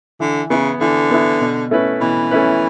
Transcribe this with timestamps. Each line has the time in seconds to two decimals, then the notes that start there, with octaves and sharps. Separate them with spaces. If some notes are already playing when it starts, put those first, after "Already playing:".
0.20 D3 E3
0.50 C#3 B3 E4
0.80 D3 E3
1.11 B3 E4
1.41 B2
1.71 A3 C#4 E4 B4
2.01 B2 E3
2.31 A3 C#4 E4 B4